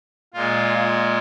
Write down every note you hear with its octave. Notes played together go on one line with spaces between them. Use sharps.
A#2 G#3 F4